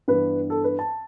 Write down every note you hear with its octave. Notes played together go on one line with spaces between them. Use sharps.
G2 E3 B3 B4
A4
B4
A5